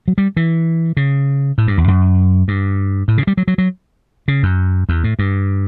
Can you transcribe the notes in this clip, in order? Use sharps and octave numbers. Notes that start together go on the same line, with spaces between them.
F#3
G3
E3
C#3
A2
G2
E2
F#2
G2
A2
C#3
G3
F#3
F#3
F#3
C#3
F#2
E2
A2
G2